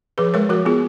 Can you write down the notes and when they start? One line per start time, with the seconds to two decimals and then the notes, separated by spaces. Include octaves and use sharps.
0.18 F3 G#4 B4
0.34 G#3 A#4 C#5
0.49 F3 F#4 A#4
0.65 B3 F4 G#4